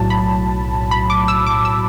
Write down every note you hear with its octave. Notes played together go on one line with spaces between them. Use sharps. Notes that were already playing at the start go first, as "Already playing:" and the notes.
Already playing: B1 A2 F#3 A5
B5
B5
D6
E6
D6
E6